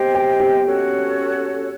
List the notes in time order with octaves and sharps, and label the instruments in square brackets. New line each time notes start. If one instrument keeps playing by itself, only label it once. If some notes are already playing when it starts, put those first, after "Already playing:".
Already playing: [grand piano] G4 [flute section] C5 D#5 G5
[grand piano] G4
G4
[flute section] C#4 F#4 A4 C#5